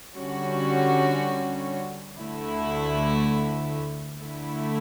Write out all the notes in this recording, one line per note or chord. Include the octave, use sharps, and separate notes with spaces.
D3 G3 C#4 F#4
D2 D3 A3 E4
D3 A3 E4